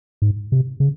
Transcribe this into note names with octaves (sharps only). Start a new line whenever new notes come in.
G#2
C3
C#3